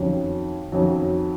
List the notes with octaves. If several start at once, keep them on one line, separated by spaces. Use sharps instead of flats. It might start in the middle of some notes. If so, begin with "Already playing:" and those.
Already playing: F2 D#3 F#3 C#4
F2 D#3 F#3 C#4